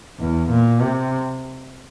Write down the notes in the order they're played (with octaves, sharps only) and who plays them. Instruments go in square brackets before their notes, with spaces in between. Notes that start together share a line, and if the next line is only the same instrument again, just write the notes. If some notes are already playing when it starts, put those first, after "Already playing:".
[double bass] E2
A#2
C3